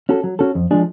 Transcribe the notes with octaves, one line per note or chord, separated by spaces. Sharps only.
C#4 F#4 A4
F#3
C#4 F#4 A4
F2
F3 G#3 D4 G#4